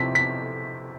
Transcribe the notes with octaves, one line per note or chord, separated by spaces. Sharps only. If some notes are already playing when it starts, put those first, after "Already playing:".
Already playing: C3 F3 C4 E4 B6
B6